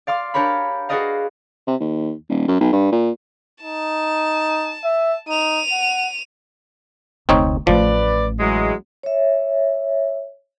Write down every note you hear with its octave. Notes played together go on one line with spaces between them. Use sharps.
D5 F5 C6 D6
D4 G4 A#4 C#5 B5
F#4 G#4 B4 D5 D#5 F5
C3
D#2
D#1
F#2
B1
G2
A#2
D#4 A5
E5
D#4 D#7 F7
F#5
F1 D2 C4 D#4 C#5
A1 F3 A3 B4 D5
E3 F#3 G#3
C#5 E5